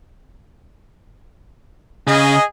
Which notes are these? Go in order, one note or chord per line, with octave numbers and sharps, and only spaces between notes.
C#3 G#4 D#5